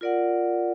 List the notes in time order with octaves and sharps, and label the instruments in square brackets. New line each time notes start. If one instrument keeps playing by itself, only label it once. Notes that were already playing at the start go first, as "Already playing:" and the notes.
[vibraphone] F4 A#4 D5 F#5